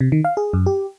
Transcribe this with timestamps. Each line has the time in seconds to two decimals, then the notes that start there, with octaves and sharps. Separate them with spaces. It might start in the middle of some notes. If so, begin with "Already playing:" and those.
0.01 C3
0.12 D#3
0.24 F5
0.37 G#4
0.53 F#2
0.66 G4